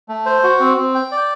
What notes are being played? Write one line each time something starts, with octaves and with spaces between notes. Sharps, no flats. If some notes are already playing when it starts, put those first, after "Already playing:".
A3
C5
F#4
C4
C4
G5
D5